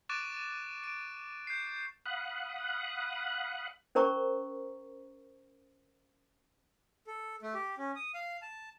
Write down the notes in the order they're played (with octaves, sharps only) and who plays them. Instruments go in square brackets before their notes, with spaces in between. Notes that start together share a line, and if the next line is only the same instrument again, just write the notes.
[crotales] C#6 D6 F#6 A6 D7 E7
D7
G6 C7
[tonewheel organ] F5 F#5 B5 D#6 F#6
[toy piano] C#4 A#4 C5 A#5 C#6
[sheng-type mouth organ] A4
A3
G4
C#4
D#6
F5
A5